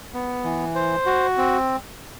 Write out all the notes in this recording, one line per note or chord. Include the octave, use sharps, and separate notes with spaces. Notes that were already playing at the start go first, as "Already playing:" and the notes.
B3
E3
C5
F#4
C4